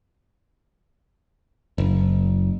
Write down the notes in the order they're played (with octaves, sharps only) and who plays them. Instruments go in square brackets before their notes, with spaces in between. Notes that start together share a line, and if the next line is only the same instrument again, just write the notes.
[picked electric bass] F#1